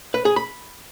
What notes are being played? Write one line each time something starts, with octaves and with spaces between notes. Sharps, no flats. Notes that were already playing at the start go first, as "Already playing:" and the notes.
B4
G#4
B5